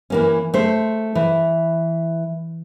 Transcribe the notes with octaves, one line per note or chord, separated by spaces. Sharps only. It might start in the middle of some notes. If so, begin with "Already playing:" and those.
E3 A#3 C#4
A3 C5
E3